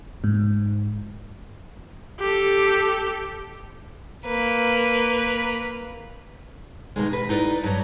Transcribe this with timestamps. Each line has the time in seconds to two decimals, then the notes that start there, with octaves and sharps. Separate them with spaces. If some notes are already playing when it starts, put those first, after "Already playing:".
0.24 G#2
2.20 G4 A4
4.26 A#3 B4
6.96 B2 D#3 G#3
7.13 B4
7.29 D#4 E4 B4 D5
7.63 G2 F#3